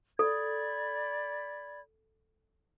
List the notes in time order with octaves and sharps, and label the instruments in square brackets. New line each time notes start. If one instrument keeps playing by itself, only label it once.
[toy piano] A4 [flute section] D5 B5 G#6